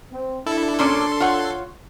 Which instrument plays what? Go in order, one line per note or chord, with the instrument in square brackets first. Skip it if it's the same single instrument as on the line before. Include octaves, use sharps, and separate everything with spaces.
[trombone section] C4
[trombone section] D4 [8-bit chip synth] E4 A4
[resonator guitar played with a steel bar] A#2 C#4 D5 [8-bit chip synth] A4 C6
[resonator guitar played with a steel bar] F4 C#5 F#5